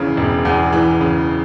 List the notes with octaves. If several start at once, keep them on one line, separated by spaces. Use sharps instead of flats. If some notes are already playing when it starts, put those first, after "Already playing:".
Already playing: E1 E2 C#3 E3
E1
E2
E3
C#3